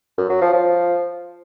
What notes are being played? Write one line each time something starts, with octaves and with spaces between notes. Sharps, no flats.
F#2
F#3
F3
F3